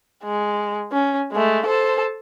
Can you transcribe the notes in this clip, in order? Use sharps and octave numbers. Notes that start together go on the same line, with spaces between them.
G#3
C#4
G#3 A3
A4 C5